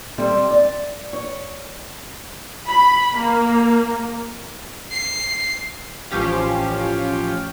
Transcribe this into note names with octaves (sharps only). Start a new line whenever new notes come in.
G3 C4 A4 E5
D5
C#5
B5
A#3
C7
A1 F3 C#4 G4 F5